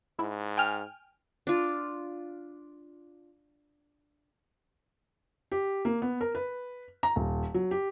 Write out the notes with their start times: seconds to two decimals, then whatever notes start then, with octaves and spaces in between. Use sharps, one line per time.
0.19 G#2 E4
0.58 G5 G#5 F6
1.47 D4 F4
5.52 G4
5.85 A#3
6.02 B3
6.21 A#4
6.35 B4
7.03 A#5
7.16 D#1
7.54 F#3
7.71 G4